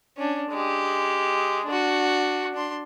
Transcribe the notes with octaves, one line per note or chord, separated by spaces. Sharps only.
C#4 D4
G#3 G4
D4 F#4
D4 C6